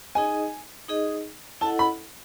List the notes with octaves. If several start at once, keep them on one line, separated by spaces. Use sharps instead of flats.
D#4 G#4 D#5 G#5
D#4 G#4 D#5
E4 A4 D#5 F#5 A5
B5